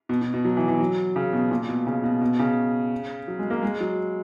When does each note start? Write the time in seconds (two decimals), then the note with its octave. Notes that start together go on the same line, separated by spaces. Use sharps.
0.09 B2
0.22 B2
0.34 B2
0.45 F#3
0.57 E3
0.68 E3
0.80 F#3
1.16 C#3
1.33 B2
1.51 A#2
1.69 B2
1.87 C#3
2.04 B2
2.21 B2
2.39 C#3
3.28 F#3
3.39 G#3
3.50 A#3
3.63 G#3
3.80 F#3